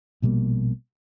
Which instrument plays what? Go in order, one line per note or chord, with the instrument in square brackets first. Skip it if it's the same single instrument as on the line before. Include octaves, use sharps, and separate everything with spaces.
[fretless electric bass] A#1 B2 G3 A#3